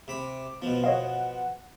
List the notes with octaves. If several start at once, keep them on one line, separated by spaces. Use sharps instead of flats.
C3 B5 D6
B2 F3 B3
C#5 D#5 F5 F#5